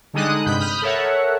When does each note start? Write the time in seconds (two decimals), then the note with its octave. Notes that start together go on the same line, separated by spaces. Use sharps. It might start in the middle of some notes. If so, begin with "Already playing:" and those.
0.13 D3 G3 G#3 D#4 D#6 F#6
0.46 G2 C3 B5 G6
0.59 B5 D#6 F6 G6
0.82 A4 A#4 C#5 E5 F#5